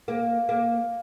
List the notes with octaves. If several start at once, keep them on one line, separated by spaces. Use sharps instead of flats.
A#3
A#3